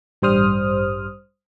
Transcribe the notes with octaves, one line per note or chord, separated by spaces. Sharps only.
A1 G2 G3 C5 D#6 F6